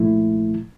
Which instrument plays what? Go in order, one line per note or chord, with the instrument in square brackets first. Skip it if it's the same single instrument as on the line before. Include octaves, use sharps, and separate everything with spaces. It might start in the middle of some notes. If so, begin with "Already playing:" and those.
Already playing: [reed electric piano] C2 A#2 F3 A3 E4